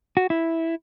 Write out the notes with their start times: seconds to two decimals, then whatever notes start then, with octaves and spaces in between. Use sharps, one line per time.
0.17 F#4
0.30 E4